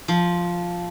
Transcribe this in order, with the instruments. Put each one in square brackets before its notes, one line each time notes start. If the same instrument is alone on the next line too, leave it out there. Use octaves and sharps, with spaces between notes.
[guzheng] F3